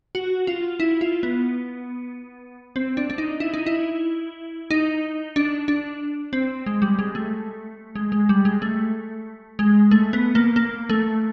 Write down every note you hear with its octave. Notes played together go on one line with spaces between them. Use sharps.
F#4
F4
E4
F4
B3
C4
D4
D4
D#4
E4
D#4
E4
D#4
D4
D4
C4
G#3
G3
G#3
A3
G#3
G#3
G3
G#3
A3
G#3
A3
B3
A#3
A#3
A3